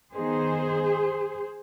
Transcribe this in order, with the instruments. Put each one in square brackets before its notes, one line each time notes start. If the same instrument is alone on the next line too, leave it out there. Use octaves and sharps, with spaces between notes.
[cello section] D#3 B3 D#4 G#4 C5